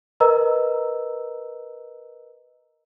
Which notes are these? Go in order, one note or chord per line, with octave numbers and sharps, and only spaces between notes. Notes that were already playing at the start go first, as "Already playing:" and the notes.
A#4 B4 D#5 A#5 E6